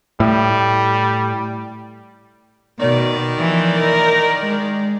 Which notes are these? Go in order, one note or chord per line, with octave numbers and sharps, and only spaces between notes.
A2 G3
B2 D#3 D5
E3 F3
A#4
G#3